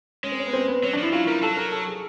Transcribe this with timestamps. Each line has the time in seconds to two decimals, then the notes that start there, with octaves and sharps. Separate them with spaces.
0.23 G#3 C#4
0.32 C4
0.39 C#4
0.47 B3
0.53 C4
0.68 B3
0.83 F#3 C#4
0.93 D4
0.98 F3
1.03 E4
1.12 F#3 F4
1.27 G3 A#4
1.42 F#3 A4
1.57 A#4
1.72 A4
1.87 G#4